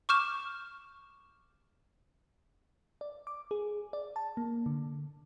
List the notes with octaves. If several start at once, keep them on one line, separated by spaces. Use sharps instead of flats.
C#6 D6 F6 G6 E7
D5
D6
G#4
D5
A5
A#3
D3